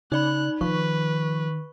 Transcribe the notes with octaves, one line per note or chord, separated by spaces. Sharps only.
C#3 D#4 D5 B5 F#6
D#3 F3 B4 C#6